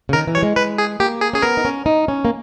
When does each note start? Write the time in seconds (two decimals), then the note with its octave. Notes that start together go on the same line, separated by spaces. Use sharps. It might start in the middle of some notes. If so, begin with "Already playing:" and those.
0.09 C#3
0.13 D#3 A#4
0.27 E3
0.35 G3 C#5
0.43 G#3
0.56 G#3 B4
0.78 G#4
1.00 A#3 G4
1.21 G#4
1.33 C#4 G#4
1.42 B3 A#4
1.57 D#4
1.65 C#4
1.86 D#4
2.08 C#4
2.25 A#3